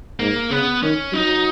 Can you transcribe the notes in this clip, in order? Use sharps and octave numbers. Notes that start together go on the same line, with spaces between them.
G#2 A#3
C#3 B3
D#3 C#4
F#3 D#4